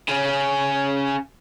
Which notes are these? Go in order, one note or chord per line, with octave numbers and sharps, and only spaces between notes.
C#3 C#4